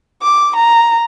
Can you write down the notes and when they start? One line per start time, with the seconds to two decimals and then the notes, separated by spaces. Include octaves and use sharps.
0.22 D6
0.56 A#5